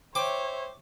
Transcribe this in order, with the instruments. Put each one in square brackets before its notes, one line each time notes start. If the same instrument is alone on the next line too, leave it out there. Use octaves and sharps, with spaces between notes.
[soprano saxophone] C5 [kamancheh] C#5 E5 [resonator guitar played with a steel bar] G5 [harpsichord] D6